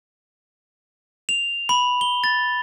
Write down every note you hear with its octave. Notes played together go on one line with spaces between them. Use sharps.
F7
B5
G7
A6